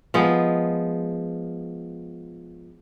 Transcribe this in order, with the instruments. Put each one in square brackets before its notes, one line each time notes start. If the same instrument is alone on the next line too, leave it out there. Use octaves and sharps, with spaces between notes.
[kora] F3 G#3 B3